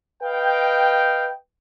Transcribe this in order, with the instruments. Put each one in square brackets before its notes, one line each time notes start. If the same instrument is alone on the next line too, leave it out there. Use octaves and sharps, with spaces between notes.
[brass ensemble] B4 D#5 F5 G5